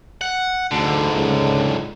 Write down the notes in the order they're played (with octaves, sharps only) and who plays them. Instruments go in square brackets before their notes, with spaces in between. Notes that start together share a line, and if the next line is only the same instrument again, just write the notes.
[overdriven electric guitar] F#5
[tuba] D2 [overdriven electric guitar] G#2 D3
[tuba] C#2